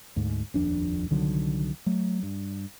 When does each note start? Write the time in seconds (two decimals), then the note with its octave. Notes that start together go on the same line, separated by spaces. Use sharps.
0.16 D2 G#2
0.54 D#1 A#1 F2 D4
1.10 C2 D3 D#3 F#3
1.86 F#3 A3
2.23 G2